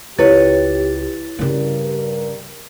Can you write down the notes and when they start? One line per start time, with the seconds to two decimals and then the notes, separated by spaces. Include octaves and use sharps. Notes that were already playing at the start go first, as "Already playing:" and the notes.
0.19 C#2 E4 G4 B4 C#5 A6
1.39 G2 C#3 G3 C#4 A#4